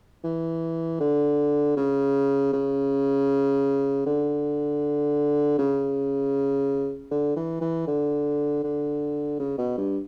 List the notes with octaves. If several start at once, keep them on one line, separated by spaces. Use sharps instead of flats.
E3
D3
C#3
C#3
D3
C#3
D3
E3
E3
D3
D3
C#3
B2
G2